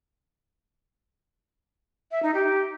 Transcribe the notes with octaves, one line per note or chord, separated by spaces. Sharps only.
E5
D#4
G4